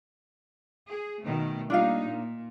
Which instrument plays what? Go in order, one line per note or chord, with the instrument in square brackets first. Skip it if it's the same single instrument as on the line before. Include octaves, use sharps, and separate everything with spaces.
[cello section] G#4
B2 D#3 A3
[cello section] G3 A#3 D#4 [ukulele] D4 F4 F5
[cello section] A#2